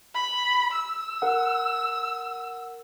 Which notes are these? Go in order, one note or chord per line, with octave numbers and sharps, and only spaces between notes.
B5
E6
A#4 F#5